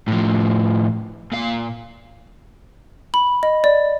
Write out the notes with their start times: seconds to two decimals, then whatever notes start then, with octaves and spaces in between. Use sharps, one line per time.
0.08 A2 F3
1.32 A#2 F5
3.14 B5
3.43 D#5
3.64 D5